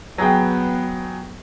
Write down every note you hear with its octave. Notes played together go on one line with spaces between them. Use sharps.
F#3 B3 G#4 G5